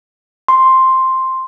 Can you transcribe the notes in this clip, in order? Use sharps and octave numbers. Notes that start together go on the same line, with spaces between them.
C6